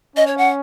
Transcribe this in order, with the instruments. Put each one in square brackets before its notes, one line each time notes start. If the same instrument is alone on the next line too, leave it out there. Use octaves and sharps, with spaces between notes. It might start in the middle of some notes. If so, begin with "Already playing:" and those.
[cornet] C#4 [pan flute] D#5
[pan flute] C#5
F#5